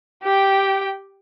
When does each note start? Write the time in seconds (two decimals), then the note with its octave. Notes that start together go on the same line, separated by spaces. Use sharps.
0.23 G4 G5